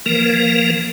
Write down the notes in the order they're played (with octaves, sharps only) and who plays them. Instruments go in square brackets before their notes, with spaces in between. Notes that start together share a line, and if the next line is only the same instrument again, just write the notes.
[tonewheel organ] E3 F3 A#3 A#4